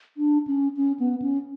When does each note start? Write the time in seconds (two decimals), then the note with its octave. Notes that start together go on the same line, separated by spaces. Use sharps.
0.17 D4
0.47 C#4
0.77 C#4
1.00 B3
1.22 C#4